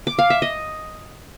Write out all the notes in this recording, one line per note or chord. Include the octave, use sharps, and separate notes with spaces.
D6
F5
E5
D#5